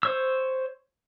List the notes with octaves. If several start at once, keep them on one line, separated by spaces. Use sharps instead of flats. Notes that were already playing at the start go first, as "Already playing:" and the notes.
C5 C#5 E6